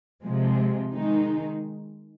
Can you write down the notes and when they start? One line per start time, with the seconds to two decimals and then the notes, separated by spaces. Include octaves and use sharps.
0.24 C3 F3 G#3
0.91 D#3 G#3 D#4